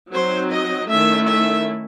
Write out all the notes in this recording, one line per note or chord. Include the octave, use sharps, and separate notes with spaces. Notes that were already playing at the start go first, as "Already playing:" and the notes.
F#3 C4 D#4 C5
D#5
D#3 A3 C#4 E4 E5
E5